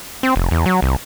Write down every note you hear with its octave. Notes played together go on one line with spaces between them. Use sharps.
C4
F1
E2
F#3
C2